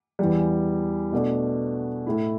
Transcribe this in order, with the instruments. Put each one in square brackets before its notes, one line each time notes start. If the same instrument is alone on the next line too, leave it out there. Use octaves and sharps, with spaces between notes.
[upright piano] E2 E3 G3
B2 A3 D4
A2 A3 E4